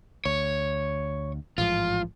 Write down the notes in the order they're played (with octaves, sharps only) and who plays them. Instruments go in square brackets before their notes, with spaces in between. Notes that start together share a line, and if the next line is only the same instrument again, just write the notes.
[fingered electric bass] D2 [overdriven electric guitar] C#5
[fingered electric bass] A1 G#2 F3 [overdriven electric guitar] F4